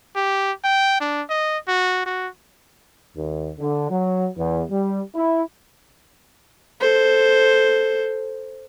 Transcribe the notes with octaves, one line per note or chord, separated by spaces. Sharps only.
G4
G5
D4
D#5
F#4
F#4
D#2
D3
F#3
E2
G3
E4
A4 C5